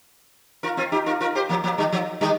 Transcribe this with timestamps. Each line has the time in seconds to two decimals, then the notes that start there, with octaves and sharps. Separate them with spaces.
0.63 F4 A#4
0.77 C4 F4
0.92 D#4 G4
1.06 F4 A#4
1.20 F4 A#4
1.35 G4 C5
1.49 F3 A#3
1.64 F3 A#3
1.78 D#3 G3
1.92 F3
2.21 D#3 G3